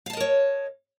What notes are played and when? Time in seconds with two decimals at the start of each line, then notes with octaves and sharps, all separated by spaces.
0.06 F5
0.10 A5
0.13 D#5
0.17 A#4
0.20 C#5